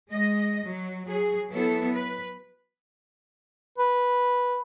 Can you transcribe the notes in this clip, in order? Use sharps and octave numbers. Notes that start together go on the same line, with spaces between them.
G#3 D#5
F#3
F#3 G#4
F#3 B3 E4 A4
B4
B4